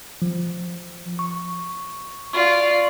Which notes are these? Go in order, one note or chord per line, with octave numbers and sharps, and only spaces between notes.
F3
C#6
F4 D5 C#6